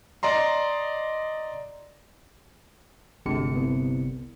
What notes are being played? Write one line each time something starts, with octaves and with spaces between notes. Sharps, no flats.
D5 D#5 A#5 C6
G1 D2 C3 G#3 C#7
C2 B3